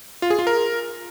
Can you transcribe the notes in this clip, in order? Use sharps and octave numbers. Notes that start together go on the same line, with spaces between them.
F4
G#4
F4
A#4